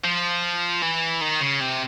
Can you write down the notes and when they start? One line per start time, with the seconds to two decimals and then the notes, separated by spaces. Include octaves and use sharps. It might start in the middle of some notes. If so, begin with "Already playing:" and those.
0.04 F3
0.82 E3
1.21 D#3
1.41 C#3
1.61 C3